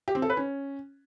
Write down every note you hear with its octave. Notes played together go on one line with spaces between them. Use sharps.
G4
C4
A4
B4
C#4